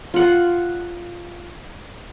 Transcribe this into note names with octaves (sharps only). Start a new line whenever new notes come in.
F4 F#5